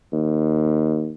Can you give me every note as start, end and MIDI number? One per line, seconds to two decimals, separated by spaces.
0.12 1.14 39